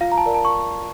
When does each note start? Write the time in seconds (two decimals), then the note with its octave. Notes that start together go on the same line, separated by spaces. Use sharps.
0.01 F4 F5
0.12 A#5
0.18 A5
0.26 A#4 D5
0.34 A5
0.45 C#6